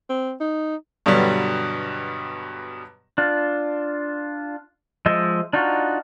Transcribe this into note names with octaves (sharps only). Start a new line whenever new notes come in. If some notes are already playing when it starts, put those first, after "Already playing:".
C4
D#4
G2 B2 D3 F#3 G3
D4 F4
F3 G#3 D#5 E5
D4 D#4 F4 F#4